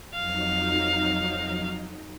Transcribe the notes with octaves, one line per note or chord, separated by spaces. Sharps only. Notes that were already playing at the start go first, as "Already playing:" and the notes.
F2 F#3 D#4 F5